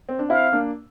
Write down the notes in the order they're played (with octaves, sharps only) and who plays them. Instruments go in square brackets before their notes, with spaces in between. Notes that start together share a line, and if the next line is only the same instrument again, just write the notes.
[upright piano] C4
D4
[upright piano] C4 E4 [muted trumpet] F5
[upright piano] A#3 D4